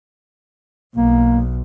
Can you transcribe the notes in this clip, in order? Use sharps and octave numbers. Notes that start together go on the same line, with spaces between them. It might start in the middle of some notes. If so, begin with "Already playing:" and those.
B1 A#3